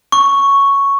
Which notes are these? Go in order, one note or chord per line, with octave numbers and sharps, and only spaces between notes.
C#6